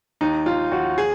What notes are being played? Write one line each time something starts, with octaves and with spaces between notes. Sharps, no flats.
D#2 D#4
D#2 F4
D#2 F#4
G#4